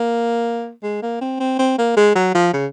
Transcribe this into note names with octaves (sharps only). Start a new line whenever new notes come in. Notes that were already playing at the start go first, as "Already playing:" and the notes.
Already playing: A#3
G#3
A#3
C4
C4
C4
A#3
G#3
F#3
F3
C#3